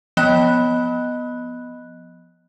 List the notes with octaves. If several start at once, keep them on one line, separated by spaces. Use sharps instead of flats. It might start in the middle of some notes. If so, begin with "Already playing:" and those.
F3 B3 D#5 B5 F#6